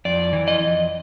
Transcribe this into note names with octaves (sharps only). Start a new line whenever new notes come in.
F2 D5
E3
D#5
F2